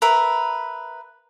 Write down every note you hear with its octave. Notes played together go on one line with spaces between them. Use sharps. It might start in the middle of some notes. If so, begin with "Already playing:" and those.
A#4 B4 E5